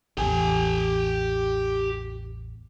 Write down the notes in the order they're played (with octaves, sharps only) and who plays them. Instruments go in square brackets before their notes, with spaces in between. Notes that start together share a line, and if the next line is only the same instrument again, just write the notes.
[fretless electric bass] A1 E2 [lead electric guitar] G4 G#5